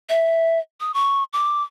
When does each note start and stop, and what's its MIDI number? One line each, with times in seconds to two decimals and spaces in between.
0.09 0.59 76
0.80 0.94 87
0.94 1.24 85
1.33 1.63 86